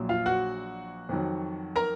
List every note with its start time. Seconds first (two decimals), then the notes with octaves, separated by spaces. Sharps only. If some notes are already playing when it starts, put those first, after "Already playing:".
Already playing: A#1 A#2 F#3
0.09 F4 F5
0.26 F#4 F#5
1.09 F2 D#3 F#3
1.76 A#4 A#5